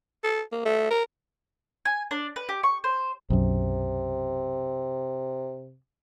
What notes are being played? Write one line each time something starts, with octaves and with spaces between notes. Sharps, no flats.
A4
A#3
A3
A#4
G#5
D4
B4
G4
C#6
C5
B1 F#2 C3